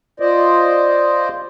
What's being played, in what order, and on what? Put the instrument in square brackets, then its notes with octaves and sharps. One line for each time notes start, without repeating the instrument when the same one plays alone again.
[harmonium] F4 C5 D5 D#5